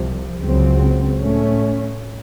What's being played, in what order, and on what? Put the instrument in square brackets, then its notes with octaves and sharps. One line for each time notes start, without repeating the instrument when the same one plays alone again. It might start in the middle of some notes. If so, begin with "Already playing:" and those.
Already playing: [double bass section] C2 C3 F3
C#2 C#3 F#3 C4
A2 A3 C#4